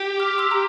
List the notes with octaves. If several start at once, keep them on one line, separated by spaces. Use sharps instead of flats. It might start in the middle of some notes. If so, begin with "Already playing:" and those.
Already playing: G4
D6 F6
C6 E6
A#5